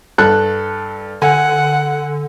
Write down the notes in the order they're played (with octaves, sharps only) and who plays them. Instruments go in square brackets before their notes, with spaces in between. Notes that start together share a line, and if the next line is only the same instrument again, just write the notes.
[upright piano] G2 A4 F#6
[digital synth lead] D3 [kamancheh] F#5 [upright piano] G#5